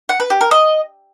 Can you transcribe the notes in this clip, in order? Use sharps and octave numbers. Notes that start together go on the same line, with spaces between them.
F#5
B4
G4
A#4
D#5